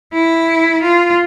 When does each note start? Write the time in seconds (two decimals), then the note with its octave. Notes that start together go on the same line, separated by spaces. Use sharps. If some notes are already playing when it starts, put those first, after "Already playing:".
0.13 E4
0.82 F4